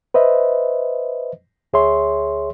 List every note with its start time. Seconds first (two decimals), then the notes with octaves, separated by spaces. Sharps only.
0.14 B4 C5 D#5 E5
1.73 D2 G#4 C#5 E5 C6